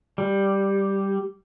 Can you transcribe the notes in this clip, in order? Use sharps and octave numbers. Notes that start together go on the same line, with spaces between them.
G3